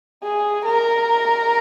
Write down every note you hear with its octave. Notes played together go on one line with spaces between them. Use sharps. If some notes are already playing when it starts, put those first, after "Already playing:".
G#4
A#4